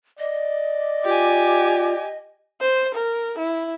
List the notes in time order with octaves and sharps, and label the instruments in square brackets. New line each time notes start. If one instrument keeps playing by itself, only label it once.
[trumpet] D5 [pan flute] D#5
[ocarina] F4 [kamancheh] G4 G#5
[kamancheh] C5
A#4
E4